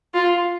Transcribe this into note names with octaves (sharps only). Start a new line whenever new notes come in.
F4